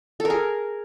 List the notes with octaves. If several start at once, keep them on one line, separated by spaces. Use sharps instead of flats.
A4
A#4
G#4